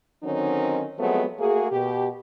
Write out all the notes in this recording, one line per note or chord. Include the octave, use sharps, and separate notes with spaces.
D3 D#3 F#3 C4 C#4 D#4
F3 F#3 G#3 A3 B3 C4
A3 A#3 F#4 G#4
B2 G4